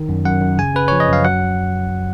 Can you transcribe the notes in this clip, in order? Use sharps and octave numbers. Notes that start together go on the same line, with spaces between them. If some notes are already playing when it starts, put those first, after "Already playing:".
Already playing: D#3
F#2
F#2 F#5
F#2
C#3 G#5
C#3 B4
F3 C#5
D#5
F#2 F5
F#3 F#5